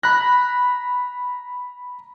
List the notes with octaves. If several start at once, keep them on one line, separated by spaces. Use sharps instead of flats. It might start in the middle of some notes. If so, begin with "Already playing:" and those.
A#5 B5 F#6 A#6